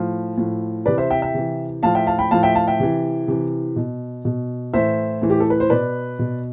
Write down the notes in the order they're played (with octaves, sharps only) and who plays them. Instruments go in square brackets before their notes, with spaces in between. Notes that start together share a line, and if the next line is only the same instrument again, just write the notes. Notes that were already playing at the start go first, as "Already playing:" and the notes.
Already playing: [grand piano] A2 F3
A2 F3
C3 E3 B4 D5
C5 E5
E5 G5
E5 G5
C3 E3
A2 F3 F5 A5
E5 G5
F5 A5
G5 B5
A2 F3 F5 A5
E5 G5
F5 A5
E5 G5
C3 E3
C3 E3
B2
B2
A2 E3 C5 E5
A2 E3
G4
A4
B4
C5
B2 B4 D5
B2